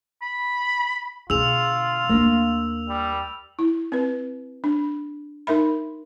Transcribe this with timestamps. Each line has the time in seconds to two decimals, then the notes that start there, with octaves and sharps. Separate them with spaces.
0.22 B5
1.30 B2 D3 F4 G#4 E6 F7
2.09 D#2 A#3 D4
2.89 G3
3.59 E4
3.92 C4 B4
4.64 D4
5.47 D#4 A#4 E5 B5